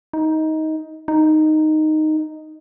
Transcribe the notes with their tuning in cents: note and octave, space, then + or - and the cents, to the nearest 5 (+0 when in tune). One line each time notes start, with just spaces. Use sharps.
D#4 +15
D#4 -5